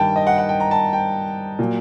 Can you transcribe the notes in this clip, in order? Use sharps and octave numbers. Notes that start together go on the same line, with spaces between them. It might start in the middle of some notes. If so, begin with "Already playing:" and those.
Already playing: G2 D#3 G3 G5 A5
D#5
F#5
F#5
G5
A#5
A5
G5
A#2 F#3